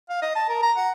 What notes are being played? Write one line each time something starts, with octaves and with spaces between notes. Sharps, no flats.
F5
D#5
A5
A#4
A#5
F#5